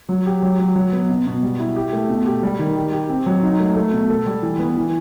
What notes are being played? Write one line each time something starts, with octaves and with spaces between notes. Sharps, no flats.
F#3
G4
F#3
F#3
F#3
B3
B2
B2
G3
E4
G4
A3
B2
G4
G3
D#3
G4
G4
C4
F#3
D#4
A3
A3
B2
A4
G3
E3
B3
E3